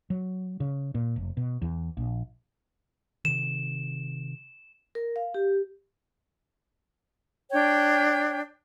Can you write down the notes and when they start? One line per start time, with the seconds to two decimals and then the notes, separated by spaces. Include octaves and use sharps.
0.10 F#3
0.60 C#3
0.95 A#2
1.16 F1
1.37 B2
1.62 E2
1.97 A#1
3.25 C3 D#3 E7
4.95 A#4
5.16 F5
5.34 G4
7.51 D4 C#5 G5